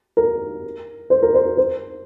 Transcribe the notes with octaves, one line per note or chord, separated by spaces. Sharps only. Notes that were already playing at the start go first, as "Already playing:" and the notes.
A#4
C5
A#4
C5
A#4
C5